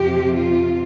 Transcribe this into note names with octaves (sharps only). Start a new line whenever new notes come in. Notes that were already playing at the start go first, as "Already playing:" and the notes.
Already playing: F2 C3 F3 C4 G4
F4